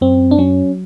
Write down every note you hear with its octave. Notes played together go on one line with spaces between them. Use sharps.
F#2 C4
D4
F#3 C#4